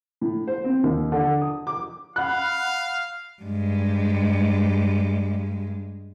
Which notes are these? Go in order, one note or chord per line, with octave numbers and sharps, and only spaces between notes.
A2
C5
C4
D#2
D3
D#6
D6
F5 F#5 B5 F#6
G2 G#3